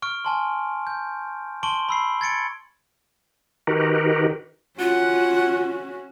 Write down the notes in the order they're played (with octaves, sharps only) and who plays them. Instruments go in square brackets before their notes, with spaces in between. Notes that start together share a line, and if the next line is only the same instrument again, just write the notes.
[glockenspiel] C#6 F6 D7
G#5 A5 C6
G6
A5 C6 C#6 D7 F#7 G7
B5 E6 C7
G#6 A6 C#7 D7
[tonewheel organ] D#3 D#4 F#4 G4 A#4 B4
[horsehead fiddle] C#4 F#4 [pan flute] F4 [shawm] F#5